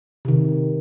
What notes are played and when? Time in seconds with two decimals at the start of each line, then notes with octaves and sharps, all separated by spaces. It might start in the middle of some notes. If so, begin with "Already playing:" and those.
0.25 C3 D#3